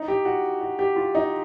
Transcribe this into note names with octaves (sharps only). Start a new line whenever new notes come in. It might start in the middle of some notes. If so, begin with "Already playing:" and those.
Already playing: D#4
G4
F#4
F#4
G4
F4
D#4